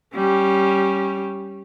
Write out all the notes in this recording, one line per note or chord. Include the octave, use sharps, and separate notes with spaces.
G3 C#4